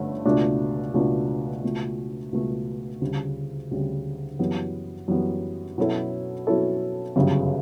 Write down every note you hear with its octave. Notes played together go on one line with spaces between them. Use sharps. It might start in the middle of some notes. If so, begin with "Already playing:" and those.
Already playing: G1 G2 D3 A3 C#4
C#2 B2 A3 D4
C#2 B2 A3 D4
C#2 B2 A3
C#2 B2 A3
D2 C#3 G3
D2 C#3 G3
F#2 E3 G3 B3
F#2 E3 G3 B3
B2 F#3 C#4 E4 A4
B2 F#3 C#4 E4 A4
G1 F#2 C#3 G3